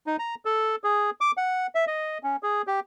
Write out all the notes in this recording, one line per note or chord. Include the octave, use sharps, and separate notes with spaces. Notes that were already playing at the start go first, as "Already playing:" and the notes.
D#4
A#5
A4
G#4
D6
F#5
E5
D#5
C#4
G#4
G4